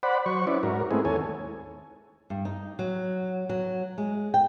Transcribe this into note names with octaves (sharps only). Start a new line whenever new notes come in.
C5 D5 F#5 B5
F#3 C5 C#6
C#4 E4 B4 D5
G#2 F#4 A#4
G#3 A3 B3 C4 E4 G#4
D#2 A4 C#5 G#5
G2
D#4
F#3
F#3
G#3
G5